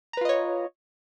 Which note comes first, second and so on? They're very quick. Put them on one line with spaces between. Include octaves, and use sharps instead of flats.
A#5 B4 F4 D#5 C#5